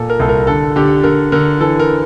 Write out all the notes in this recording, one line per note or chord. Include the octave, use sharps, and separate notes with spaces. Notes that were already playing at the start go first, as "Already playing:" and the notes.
Already playing: A#2 A4
A#4
C2 A4
A#4
D3 A4
D3 G4
D3 A#4
D3 A#4
E3 A4
A#4